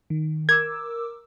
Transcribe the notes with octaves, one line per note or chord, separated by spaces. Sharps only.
D#3
A#4 D6 E6 G#6